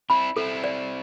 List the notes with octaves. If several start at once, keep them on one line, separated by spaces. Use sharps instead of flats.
C4 E4 B5
C4 E4 A4
D5